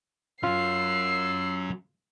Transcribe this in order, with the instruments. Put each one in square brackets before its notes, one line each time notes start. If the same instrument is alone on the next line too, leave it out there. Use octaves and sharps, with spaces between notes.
[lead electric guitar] F#3 C#4 [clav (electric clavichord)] F4 [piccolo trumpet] E6 [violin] C7